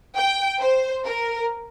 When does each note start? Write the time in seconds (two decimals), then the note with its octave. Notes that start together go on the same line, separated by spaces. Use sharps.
0.16 G5
0.61 C5
1.07 A#4